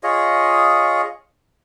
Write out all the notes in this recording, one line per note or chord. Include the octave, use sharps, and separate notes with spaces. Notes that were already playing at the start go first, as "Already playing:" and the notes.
F4 G#4 C#5 D#5